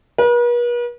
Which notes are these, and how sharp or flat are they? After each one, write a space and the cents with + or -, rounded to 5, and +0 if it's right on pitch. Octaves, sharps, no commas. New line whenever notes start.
B4 -45